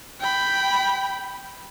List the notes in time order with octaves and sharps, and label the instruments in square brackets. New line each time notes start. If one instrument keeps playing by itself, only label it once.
[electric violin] G5 B5